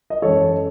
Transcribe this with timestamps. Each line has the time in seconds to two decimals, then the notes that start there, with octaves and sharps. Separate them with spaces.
0.10 D#5
0.22 F#2 E3 G#3 A4 C#5